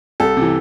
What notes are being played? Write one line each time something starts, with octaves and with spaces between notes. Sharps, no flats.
C2 A4
C3 E3